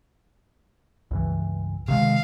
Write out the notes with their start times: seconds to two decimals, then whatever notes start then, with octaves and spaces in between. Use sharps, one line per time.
1.11 C#2 G2 E3
1.88 C3 D#3 G#3 F5